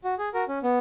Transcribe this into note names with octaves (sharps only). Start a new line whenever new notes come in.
F#4
G#4
F#4 A#4
C#4
B3